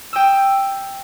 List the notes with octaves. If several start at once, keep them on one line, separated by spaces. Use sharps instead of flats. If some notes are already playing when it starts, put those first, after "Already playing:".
G5 D#6 E6